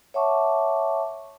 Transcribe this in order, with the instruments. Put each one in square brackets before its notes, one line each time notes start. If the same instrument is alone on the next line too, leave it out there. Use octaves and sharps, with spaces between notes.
[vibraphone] C#5 E5 F#5 A5 C#6 D6